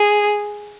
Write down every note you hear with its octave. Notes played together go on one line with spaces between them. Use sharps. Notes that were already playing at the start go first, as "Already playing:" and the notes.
Already playing: G#4